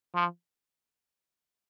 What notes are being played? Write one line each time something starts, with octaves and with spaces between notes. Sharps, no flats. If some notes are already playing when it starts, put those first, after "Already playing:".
F3